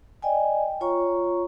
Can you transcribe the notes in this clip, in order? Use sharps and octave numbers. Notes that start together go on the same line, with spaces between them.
D5 D#5 G5 G#5
F4 C#5 A#5 C#6